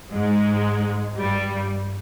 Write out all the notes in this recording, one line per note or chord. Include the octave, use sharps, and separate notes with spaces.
G#2 G#3
G2 G3